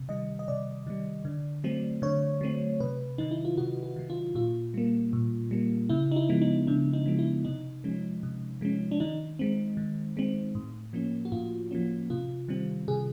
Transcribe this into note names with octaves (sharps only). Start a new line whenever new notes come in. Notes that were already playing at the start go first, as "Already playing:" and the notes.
Already playing: C3
D#3 G3 D#5
D#5
C3 D5
D#3 G3
D3
F#3 A3 C4
D3 C#5
F#3 A3 C4
C3 B4
D#3 F#3 D#4
E4
F4
C3 F#4
F#4
D#3 F#3
F4
A#2 F4
G3 A#3
A#2
G3 A#3
C#3 E4
D#4
E4
F3 G#3 B3
D#4
C#3 D4
D#4
F3 G#3 B3
E4
C3 D#4
F3 G#3 C#4
C3
F3 G#3 C#4
D4
D#3 D#4
G#3 C4
D#3
G#3 C4
A2
F3 A#3 C#4
F#4
A2 F4
F3 A#3 C#4
C3 F4
D#3 G3 C4
C3 G#4